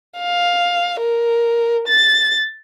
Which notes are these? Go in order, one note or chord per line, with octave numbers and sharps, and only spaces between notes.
F5
A#4
A6